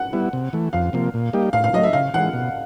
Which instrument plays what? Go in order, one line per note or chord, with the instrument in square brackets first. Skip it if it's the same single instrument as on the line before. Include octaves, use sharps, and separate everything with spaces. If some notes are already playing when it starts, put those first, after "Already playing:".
Already playing: [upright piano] F#5
[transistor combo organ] G3 B3 E4
C3
E3 A3
[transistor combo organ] F2 [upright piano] F5
[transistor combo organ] C3 F3 A#3
A#2
G3 A#3 D#4 G4
[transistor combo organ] A2 [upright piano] F5
[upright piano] F5
[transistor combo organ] F#3 [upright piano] D#5
[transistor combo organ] A3
[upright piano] E5
[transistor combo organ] C#3 [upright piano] F5
[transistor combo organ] E3 G#3 [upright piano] F#5
[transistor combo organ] B2